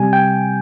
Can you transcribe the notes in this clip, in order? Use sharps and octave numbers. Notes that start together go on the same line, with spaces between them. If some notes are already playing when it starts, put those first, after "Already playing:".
Already playing: C3 G3 G#5
G5